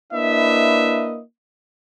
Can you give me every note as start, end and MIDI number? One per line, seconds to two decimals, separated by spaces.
0.12 1.20 58
0.12 1.20 62
0.12 1.20 64
0.12 1.20 71
0.12 1.20 75
0.12 1.20 76